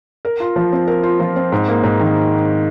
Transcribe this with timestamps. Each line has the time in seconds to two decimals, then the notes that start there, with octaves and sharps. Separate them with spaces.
0.25 A#4
0.40 F4
0.56 F3
0.73 C4
0.87 A#4
1.03 F4
1.20 F3
1.36 C4
1.52 G#2
1.68 A#3
1.84 G#2
2.01 D#3